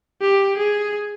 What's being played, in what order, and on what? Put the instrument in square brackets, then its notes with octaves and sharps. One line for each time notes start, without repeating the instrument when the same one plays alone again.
[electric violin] G4
G#4